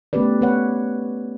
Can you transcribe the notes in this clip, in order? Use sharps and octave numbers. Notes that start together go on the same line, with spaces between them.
A3 B3 C#4 G4 B4 D5
B3 B4 C#5 F#5